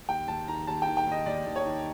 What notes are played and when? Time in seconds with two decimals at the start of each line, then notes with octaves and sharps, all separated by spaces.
0.09 D#2 G5
0.28 D#2 A5
0.48 D#3 A#5
0.67 D#2 A5
0.82 G5
0.87 D#3
0.97 G5
1.07 D#2
1.12 D#5
1.26 D#2 D5
1.46 D#2
1.56 C#5
1.66 D#3